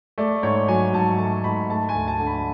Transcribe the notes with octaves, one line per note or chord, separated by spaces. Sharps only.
A3 D5
G#2 C#5
F#3 G#5
G#2 A5
A3 A5
G#2 B5
A3 A5
G#5
D2
A5
D3
B5